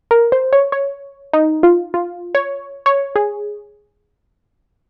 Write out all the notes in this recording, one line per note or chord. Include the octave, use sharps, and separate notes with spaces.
A#4
C5
C#5
C#5
D#4
F4
F4
C#5
C#5
G#4